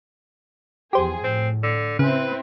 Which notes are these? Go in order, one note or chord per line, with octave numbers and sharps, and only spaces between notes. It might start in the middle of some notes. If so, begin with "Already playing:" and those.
E2 F3 G4 G#4 C5
A2 C4
D3
C#3 C4 E4 B4